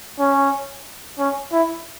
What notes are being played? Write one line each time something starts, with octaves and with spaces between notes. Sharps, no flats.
C#4
C#4
E4